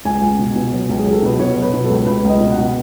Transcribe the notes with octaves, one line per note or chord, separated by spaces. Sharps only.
C#2 G#5
C#2
B2
B2
F#3
C#2
G#4
F#3
A4
B2 B4
B2 C#5
F#3
B4
B2
A4
C#2
C#2 B4
C#2
D#5
B2
F#5
B2